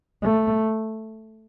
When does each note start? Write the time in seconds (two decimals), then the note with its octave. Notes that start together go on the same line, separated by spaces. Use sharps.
0.22 A3